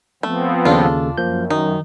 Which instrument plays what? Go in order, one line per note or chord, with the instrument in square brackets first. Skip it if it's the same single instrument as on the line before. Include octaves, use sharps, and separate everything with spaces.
[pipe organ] F3 B3 C4 [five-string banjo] A3
[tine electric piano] D#2 C#3 A4 [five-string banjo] D4 F4
[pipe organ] F#2 [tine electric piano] F3 A#3 G6
[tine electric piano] D#3 [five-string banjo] D#4